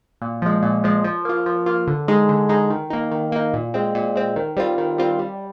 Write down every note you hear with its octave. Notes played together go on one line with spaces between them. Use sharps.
A#2
F3 G#3
A#2
F3 G#3
F3
A#3 F4
F3
A#3 F4
D3
G#3 D#4 G#4
D3
G#3 D#4 G#4
D#3
A#3 D#4
D#3
A#3 D#4
A#2
G#3 C4
A#2
G#3 C4
D#3
G3 C4 F4
D#3
G3 C4 F4
G3